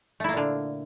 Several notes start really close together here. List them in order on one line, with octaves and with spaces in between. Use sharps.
A3 E4 A#3 A#2 D3